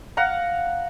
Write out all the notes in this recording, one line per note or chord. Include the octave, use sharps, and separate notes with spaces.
F5 F#5 A#5